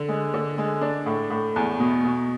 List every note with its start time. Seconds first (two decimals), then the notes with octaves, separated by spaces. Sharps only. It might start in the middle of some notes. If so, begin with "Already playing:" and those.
Already playing: D3
0.09 G#3
0.34 D3
0.58 G#3
0.81 D4
1.06 A2
1.30 A2
1.56 E2
1.80 B2
2.05 B2